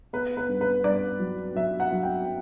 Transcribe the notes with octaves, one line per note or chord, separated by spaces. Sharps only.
B3 B4
B4
G2
B4
G2 D5
F#3
F#3 E5
F#5
F#3
G5